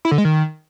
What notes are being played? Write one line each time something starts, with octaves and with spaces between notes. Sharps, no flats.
E4
D3
G#3
D#3